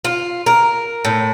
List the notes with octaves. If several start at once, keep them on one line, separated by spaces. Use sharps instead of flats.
F4
A#4
A2